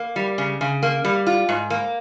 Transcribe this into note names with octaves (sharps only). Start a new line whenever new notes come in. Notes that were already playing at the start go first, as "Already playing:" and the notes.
Already playing: A#3
G3
C#3
C#3
A#3
G3
F4
G#2
A#3